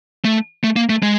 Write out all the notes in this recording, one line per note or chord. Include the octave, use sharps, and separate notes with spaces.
A3
A3
A#3
A3
G#3